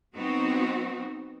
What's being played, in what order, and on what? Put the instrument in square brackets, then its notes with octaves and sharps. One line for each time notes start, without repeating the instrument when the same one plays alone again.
[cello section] F#3 B3 C4 D#4 F#4